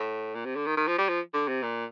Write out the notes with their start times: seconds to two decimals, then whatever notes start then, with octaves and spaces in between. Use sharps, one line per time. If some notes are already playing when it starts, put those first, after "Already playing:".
Already playing: A2
0.35 A#2
0.45 C3
0.56 D3
0.66 D#3
0.77 D#3
0.87 F3
0.98 G3
1.09 F3
1.34 D3
1.48 C3
1.63 A#2